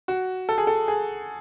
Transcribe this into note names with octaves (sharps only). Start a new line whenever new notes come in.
F#4
A4
G#4
A4
G#4